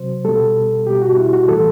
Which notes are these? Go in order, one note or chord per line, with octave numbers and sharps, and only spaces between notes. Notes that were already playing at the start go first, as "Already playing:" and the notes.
Already playing: C3 F#3 C5
B2 G3 A4
B2 G3 G4
F#4
E4
F#4
A2 E3 G3 A4